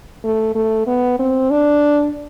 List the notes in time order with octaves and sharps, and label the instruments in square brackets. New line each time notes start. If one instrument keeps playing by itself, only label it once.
[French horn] A3
A3
B3
C4
D4